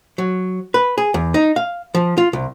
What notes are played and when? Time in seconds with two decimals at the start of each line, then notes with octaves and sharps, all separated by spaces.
0.18 F#3
0.74 B4
0.98 G#4
1.14 E2
1.34 D#4
1.56 F5
1.95 F3
2.18 F4
2.33 C2